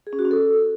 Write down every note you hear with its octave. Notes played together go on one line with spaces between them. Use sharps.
G#4
C#4
F#4
C#4
A4